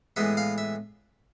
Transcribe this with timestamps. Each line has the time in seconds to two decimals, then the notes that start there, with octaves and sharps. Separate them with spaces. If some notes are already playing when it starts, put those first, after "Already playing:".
0.16 A2 E3 G#3 B3 E5
0.37 F5
0.58 E5